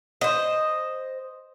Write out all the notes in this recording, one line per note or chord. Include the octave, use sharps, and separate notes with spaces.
C5 D#5